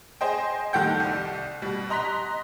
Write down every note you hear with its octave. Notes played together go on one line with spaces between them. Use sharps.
G#4 C5 D#5 G5
D#3 G3 A4 F#5 G5 G6
C2
B2 G3
D#5 A#5 C6 F#6 B6